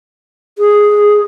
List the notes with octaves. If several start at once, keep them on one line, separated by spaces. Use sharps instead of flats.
G#4